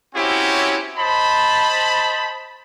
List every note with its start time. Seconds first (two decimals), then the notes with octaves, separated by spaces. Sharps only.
0.15 C4 C#4 E4 F#4 G4 C#5
0.98 C5 D#5 A5 B5